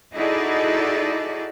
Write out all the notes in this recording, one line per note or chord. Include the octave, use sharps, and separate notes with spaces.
D#4 E4 F#4 G#4 A4 D5